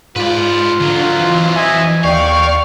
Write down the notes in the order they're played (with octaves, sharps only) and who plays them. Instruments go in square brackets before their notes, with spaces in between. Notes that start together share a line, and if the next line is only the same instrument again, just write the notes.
[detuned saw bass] G#2 [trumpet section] F4 [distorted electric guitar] B4 D5
[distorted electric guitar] F2 F#3 [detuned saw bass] D3
[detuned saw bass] E3
[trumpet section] D#5 E5 G#5
[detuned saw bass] D#2 [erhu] D5 [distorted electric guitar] F5 [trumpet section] G5 C#6